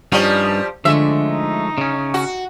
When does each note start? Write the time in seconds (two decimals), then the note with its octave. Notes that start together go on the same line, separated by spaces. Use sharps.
0.12 G2 F3 G3 C#4 D#4
0.85 D3 F3 G#3 A3 E5
1.30 D#4
1.78 C#3 C#4
2.14 F#4